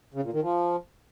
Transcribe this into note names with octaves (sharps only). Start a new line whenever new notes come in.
C#3
A#2
D#3
F3